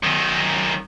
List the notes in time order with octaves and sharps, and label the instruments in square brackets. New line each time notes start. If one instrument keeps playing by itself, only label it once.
[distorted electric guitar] F#2 D#3